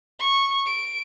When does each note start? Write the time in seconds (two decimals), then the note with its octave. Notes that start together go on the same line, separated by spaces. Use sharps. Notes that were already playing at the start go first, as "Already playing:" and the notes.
0.20 C#6
0.66 D7